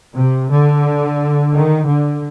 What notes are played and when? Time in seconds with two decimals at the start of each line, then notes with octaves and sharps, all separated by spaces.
0.14 C3
0.50 D3
1.53 D#3
1.86 D3